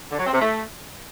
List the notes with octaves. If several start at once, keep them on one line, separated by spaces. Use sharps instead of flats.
D3
F#3
C4
C3
A3